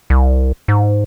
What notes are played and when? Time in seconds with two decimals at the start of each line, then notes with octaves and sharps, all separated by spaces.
0.10 C2
0.68 G#2